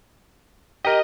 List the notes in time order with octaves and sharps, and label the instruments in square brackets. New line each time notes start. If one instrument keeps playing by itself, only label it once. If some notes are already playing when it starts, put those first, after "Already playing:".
[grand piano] G4 A#4 [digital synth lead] D#5